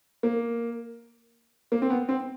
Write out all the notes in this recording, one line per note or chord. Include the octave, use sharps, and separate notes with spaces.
A#3
A#3
C4
B3
C4